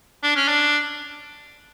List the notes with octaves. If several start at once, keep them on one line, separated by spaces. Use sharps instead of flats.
D4
C#4
D4